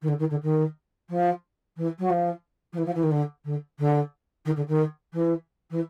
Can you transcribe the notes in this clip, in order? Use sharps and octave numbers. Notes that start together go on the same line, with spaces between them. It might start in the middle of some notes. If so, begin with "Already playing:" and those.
D#3
D3
D#3
D3
D#3
F3
E3
F#3
F3
F3
E3
F3
E3
D#3
D3
D3
D3
D#3
D3
D#3
E3
E3